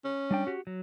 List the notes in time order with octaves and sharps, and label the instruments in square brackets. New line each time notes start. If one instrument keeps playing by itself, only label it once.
[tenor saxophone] C#4
[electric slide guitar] G3 D4 G5
F#4 G4
F#3